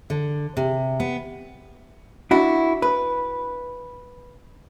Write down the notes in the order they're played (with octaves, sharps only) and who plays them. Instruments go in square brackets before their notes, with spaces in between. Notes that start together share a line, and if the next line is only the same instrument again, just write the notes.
[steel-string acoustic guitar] D3
C3
B3
[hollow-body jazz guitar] D4 E4 F#4
B4